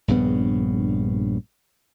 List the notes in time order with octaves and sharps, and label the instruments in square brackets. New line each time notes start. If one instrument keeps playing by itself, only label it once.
[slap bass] A#1 G2 C#3 B3